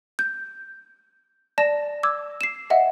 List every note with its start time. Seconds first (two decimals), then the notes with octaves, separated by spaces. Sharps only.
0.19 G6
1.58 D5 A5 A#6 E7
2.03 D6 E6 G#6
2.41 C7 E7
2.70 D#5 E5 F#5